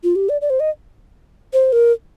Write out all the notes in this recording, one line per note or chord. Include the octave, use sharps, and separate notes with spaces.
F4
G4
D5
D5
C5
D#5
C5
A#4